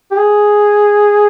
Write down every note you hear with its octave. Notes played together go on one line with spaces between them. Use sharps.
G4
G#4